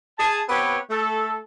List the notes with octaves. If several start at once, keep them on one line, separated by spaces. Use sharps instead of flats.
G#4 A5
B3 C4 G4 B4 C#5
A3 A4